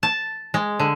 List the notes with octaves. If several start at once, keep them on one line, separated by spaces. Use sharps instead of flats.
A5
G#3
D3